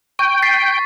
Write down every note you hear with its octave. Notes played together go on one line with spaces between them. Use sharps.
G5 C#6
A6 B6 C7